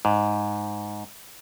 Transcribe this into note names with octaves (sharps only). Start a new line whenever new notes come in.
G#2